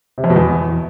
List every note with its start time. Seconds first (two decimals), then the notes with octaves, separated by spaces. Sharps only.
0.18 C3
0.24 F2
0.30 B2
0.36 E2